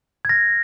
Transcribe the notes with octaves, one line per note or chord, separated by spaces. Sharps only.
G#6
F6 A#6